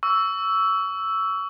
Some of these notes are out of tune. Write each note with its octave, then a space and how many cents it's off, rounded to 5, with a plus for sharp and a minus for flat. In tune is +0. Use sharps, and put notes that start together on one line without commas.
C#6 +30 E6 +0